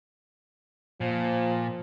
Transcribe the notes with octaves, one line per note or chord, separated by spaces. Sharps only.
A#2 F3